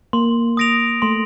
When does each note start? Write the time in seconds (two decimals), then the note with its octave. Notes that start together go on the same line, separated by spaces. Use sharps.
0.13 A#3 C6
0.57 D#6 A#6 D7 F7
1.02 A3 C6